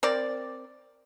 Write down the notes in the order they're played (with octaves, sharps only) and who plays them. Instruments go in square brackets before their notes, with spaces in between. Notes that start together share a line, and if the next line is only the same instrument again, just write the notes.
[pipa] C4 A#4 D5